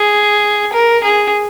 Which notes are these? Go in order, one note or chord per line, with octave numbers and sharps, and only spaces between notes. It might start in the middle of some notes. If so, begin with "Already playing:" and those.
Already playing: G#4
A#4
G#4